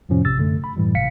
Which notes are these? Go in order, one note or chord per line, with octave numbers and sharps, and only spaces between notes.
F2 A2 C3 F3 C#4
A#1 C3 E6 A6
F#2 D3 A3
B5
F#2 A2 E3 G3
G#1 C3 F5 B6 C#7